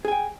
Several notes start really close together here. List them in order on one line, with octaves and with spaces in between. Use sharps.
G#4 G#5 G5